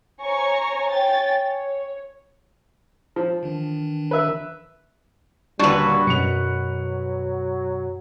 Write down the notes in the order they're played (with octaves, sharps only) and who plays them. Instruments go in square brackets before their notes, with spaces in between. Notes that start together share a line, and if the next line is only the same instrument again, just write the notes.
[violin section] C5 C#5 G#5 A#5 C#6
C#5 G5 G#5 A6
C#5
[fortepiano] F3
[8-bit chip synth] D#3 E3 D4
[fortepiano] B4 E5
[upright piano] D#1 D3 [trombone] G3 [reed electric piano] D4 A6 [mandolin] F#4 B4
[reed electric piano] F#2 B2 [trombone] F#3 [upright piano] C#7 F7